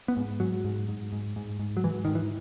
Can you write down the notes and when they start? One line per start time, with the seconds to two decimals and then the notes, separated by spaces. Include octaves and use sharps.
0.08 B3
0.17 G#2
0.40 G#2 F#3
0.65 G#2
0.88 G#2
1.13 G#2
1.36 G#2
1.59 G#2
1.77 F#3
1.83 G#2 E3
2.05 G#2 D#3
2.15 E3